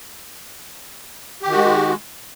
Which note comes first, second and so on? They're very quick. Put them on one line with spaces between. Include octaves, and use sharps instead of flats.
G4 D#3 F#4 G#3